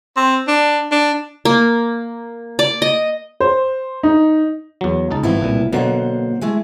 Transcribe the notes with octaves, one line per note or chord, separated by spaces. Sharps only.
C4
D4
D4
A#3
D5
D#5
C5
D#4
E2 F#3
C#2 D#4 A5
G#1 A2 F3 B3 E4
C2 A#2
B2 D3 F#3 A#3 C5 F#5
G#3 A3 E4